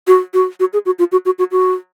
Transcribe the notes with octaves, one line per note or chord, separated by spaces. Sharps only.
F#4
F#4
F#4
G#4
F#4
F4
F#4
F#4
F#4
F#4